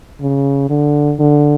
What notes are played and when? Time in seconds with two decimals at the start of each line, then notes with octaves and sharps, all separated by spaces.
0.21 C#3
0.70 D3
1.19 D3